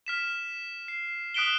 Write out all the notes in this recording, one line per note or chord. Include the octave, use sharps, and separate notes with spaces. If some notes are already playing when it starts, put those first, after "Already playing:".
F6 B6 E7
C7
D#6 F#6 B6 D7 E7 G7